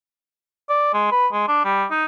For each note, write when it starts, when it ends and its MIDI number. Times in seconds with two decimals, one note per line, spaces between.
0.69 0.92 74
0.94 1.07 56
1.12 1.27 71
1.33 1.47 56
1.48 1.65 62
1.65 1.86 55
1.91 2.06 63